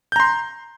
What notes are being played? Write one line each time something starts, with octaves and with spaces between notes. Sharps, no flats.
A#5 C6 G6